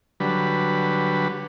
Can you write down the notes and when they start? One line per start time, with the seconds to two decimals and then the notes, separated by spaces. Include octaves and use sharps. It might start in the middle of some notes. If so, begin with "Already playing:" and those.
0.20 D3 F#3 G3 B4